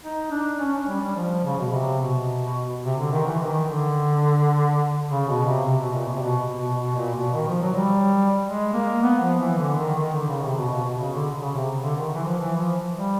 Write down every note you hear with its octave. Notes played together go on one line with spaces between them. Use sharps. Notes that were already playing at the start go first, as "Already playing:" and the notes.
D#4
D4
C#4
C#4
G3
G3
F3
C#3
B2
C3
B2
C3
D3
D#3
E3
D#3
D3
C#3
B2
C3
C3
B2
A#2
B2
C3
B2
B2
B2
A#2
B2
D#3
F3
F#3
G3
G#3
A#3
B3
F3
E3
D3
D#3
D#3
D3
C#3
C3
B2
B2
B2
C#3
D3
C#3
C3
D3
D#3
E3
F3
E3
F3
G3